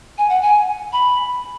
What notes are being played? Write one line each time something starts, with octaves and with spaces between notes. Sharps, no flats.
G#5
F#5
G#5
B5